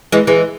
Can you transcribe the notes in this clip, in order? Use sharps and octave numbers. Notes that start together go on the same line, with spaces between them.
E3 G#3
E3 G#3